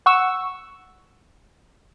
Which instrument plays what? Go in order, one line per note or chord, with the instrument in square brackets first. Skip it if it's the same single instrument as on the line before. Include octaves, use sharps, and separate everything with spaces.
[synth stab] F#5 C#6 E6